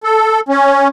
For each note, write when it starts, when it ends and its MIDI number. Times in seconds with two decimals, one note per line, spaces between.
0.04 0.40 69
0.49 0.88 61